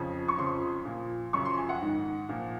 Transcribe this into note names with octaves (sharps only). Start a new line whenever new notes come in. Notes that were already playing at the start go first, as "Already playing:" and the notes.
Already playing: F2 C#3 F3
C#6
F2 C#3 F3 C6
A#2 F3
F#2 C#3 F3 C#6
C6
G#5
F#5
G#2 D#3
A#2 F3